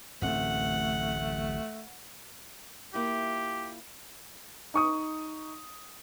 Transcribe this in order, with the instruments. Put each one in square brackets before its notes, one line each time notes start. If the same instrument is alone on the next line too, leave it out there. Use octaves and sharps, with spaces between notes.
[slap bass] D1 A1 C4 [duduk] A3 [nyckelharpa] F#5
[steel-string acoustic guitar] A#3 E4 F4 [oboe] G4
[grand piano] D#4 C#6 D#6